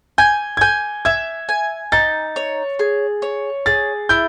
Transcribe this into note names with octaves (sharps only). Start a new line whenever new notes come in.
G#5 G6
G#6
G#5 G6
E5 G#6
G#5
D#4 A6
C#5
G#4
C#5
G#4 A6
E4 G6